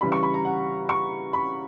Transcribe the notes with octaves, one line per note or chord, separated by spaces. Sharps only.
C#3 E3 G3 B5
C#6
B5
A#5
F#5
C#6
B5